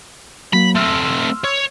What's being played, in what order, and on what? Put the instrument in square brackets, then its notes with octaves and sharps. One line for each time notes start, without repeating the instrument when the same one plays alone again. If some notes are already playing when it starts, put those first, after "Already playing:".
[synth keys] F#3 A#3 [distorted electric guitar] B5
[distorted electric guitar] A3 C4 [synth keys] C6 E6 F6
[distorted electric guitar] C#5